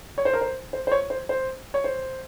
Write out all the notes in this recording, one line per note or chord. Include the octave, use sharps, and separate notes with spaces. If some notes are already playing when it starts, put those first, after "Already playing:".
C#5
C5
A#4
C5
C5
C5
C#5
C5
C5
C#5
C5